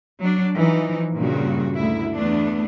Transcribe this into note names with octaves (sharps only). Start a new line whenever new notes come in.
F#3 D4
E3 F3 D#4
G2 A#2 C#3 G3 F#4
D2 E4
E2 A3 B3 D4